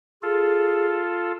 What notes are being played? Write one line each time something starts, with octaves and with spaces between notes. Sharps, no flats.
F4 G#4 A4